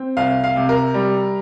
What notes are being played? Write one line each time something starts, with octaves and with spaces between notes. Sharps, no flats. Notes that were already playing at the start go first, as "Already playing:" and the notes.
Already playing: C4
C2 F5
F5
C3
A#4
G3